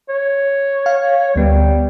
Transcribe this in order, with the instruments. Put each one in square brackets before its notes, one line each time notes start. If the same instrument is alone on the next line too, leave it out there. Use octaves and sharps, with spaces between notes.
[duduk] C#5
[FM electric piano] F5
[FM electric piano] D2 B3 [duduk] G3